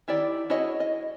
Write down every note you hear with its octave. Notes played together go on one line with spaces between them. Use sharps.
D#3 E4 G4 D5
E4 F#4 G#4 C#5 D#5
D#5